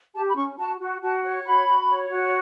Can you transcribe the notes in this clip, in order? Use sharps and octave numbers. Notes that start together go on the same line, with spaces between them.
G4 A5
B5
C#4 C#6
F#4 A5
F#4
F#4 A5
C#5
F#4 B5
F#4
C#5
F#4